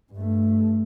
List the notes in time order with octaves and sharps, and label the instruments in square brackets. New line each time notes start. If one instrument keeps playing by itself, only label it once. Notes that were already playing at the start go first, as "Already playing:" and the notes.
[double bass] G2 A3